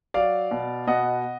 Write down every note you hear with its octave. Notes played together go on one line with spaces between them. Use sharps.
F#3 D5 F5
B2
B2 D#5 F#5